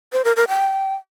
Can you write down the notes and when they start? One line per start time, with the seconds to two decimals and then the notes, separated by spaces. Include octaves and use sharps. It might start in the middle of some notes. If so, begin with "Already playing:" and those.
0.13 C5
0.25 A#4
0.36 A#4
0.48 G5